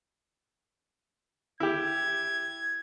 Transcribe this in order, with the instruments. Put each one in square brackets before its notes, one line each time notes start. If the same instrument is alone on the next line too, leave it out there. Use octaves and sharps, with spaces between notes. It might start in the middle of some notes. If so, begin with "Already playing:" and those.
[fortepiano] E4 G4 [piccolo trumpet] G#6